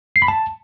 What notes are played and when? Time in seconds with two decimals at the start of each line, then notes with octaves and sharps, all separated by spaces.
0.16 C7
0.22 B5
0.28 A5